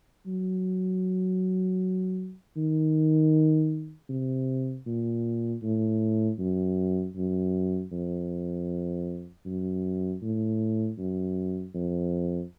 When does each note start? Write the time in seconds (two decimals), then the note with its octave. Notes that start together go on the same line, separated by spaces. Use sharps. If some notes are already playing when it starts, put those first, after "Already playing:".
0.26 F#3
2.56 D#3
4.09 C3
4.86 A#2
5.63 A2
6.39 F#2
7.16 F#2
7.92 F2
9.46 F#2
10.22 A2
10.98 F#2
11.74 F2